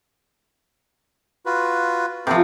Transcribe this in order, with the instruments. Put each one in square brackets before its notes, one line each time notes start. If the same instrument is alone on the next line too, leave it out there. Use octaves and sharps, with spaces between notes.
[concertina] F4 F#4 B4
[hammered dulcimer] C3 F3 [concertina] B3 A4 D6